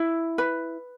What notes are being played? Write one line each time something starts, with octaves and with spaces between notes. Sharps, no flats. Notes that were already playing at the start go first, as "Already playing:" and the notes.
Already playing: E4
B4